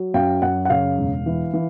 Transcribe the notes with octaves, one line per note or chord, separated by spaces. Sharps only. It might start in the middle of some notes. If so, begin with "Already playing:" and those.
Already playing: F#3
F#2 F5 G5
F#2 F#5
F#5
C#3 F5
E1
E3
E3